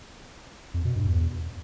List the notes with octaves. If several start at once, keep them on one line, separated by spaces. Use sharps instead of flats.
F2
B2
G2
E2